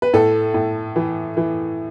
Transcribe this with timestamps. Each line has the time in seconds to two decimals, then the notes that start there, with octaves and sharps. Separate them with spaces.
0.02 B4
0.13 A2 A4
0.54 A2
0.96 E3
1.37 E3